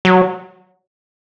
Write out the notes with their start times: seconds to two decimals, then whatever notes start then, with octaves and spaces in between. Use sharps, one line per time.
0.05 F#3